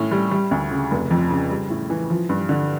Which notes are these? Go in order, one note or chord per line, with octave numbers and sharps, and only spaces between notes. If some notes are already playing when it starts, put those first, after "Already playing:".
Already playing: A2 C#4
G3
G3
D2
C#3
F1
F2
C#3
G3
A2
E3
F3
G2
D3